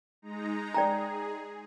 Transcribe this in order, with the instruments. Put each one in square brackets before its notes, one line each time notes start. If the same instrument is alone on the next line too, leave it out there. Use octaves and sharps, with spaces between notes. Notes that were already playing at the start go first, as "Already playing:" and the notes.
[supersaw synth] G#3 D#4 A#5
[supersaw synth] G#4 [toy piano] D5 G5 A#5